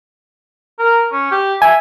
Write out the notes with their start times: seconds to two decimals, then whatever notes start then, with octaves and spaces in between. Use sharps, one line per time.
0.79 A#4
1.12 C#4
1.32 G4
1.62 E5 G#5